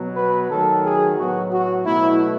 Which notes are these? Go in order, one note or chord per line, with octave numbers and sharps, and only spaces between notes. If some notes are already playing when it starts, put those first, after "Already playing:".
Already playing: B2 F#3 B3
B4
D#3 F#3 A3 A4
G#4
A2 F#3 B3 F#4
F#4
B2 F#3 A3 E4